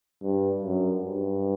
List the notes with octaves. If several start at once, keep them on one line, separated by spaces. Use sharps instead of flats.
G2
F#2
G2